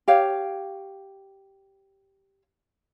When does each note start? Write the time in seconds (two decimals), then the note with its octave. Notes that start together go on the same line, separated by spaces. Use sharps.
0.08 G4 C#5 F5